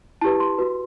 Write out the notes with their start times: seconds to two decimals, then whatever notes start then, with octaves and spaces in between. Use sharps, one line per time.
0.21 E4 G4 B4 A5
0.40 C6
0.58 F#4 B4